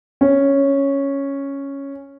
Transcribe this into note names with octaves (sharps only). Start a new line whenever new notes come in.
C#4